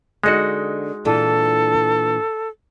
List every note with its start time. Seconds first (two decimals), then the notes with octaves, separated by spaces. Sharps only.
0.24 D3 G#3 D#4 F#4 D#5
1.05 A#2 E3 D4 A4